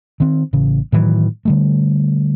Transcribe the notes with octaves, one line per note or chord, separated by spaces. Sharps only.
D#3 C4
A1 C#3
A2 D#3 E3 F#3
D3 G3 A3